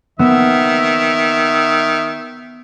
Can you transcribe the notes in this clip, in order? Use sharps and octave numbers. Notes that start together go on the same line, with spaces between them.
D#3 B3 E5